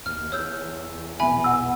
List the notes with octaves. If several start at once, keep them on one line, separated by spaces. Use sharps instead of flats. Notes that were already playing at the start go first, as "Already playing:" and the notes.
D#2 F6
E2 C#5 E6 G6
A#1 B2 B3 E5 G#5 B5
F#5 E6